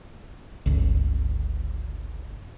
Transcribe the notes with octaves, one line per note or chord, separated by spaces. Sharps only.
G1 C#2